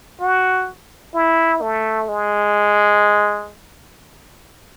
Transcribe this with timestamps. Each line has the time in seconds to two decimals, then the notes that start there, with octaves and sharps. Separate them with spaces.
0.21 F#4
1.14 E4
1.61 A3
2.09 G#3